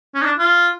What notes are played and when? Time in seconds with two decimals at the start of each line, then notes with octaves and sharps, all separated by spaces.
0.15 C#4
0.22 D#4
0.26 D4
0.39 F4